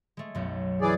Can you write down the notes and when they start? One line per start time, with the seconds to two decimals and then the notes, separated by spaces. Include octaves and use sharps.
0.17 G#3 A3
0.35 B1 F#2
0.81 E3 G#4 D5